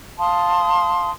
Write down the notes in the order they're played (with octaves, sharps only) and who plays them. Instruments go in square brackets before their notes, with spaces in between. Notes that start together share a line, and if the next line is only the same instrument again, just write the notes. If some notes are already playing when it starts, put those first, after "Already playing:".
[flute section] F5 A5 C6 D#6